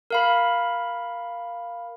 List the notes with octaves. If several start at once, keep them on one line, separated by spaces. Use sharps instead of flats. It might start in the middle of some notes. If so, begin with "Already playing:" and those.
A#4 F5 B5